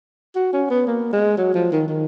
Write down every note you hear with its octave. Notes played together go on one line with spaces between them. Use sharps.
F#4
C#4
B3
A#3
G#3
F#3
F3
D#3
D#3